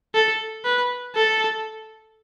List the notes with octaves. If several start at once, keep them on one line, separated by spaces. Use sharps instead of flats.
A4
B4
A4